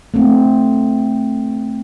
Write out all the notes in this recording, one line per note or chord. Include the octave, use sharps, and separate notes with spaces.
A3 C4